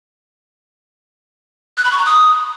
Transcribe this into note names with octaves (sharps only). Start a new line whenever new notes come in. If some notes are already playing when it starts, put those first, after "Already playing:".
F#6
B5
C#6
A#5
D#6